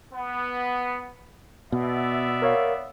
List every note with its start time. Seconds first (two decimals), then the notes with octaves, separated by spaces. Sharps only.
0.13 B3
1.72 B2 B3 D5 E5
2.42 A#4 C#5 F5